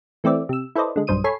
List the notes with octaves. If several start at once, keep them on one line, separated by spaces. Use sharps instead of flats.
E3 A3 C4 D5 E5
C3 E6
E4 A4 B4 C5 D5 D#5
D3 G#3
B1 G2 C5 D#6 D#7
A4 C#5 G#5 B5 C7